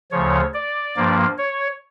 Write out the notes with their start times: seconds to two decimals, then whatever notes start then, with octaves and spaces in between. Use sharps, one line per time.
0.12 D2 C#3 F3 C#5
0.54 D5
0.96 G2 F3 A#3
1.38 C#5